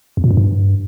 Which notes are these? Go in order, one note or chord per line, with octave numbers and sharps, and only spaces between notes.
E2
A#2
F#2
G2